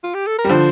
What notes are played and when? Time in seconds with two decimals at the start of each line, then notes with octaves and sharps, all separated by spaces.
0.04 F4
0.14 G4
0.27 A4
0.39 A#4
0.44 G3
0.49 D3 F3 C5